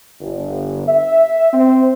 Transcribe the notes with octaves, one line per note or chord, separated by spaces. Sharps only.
G1
E5
C4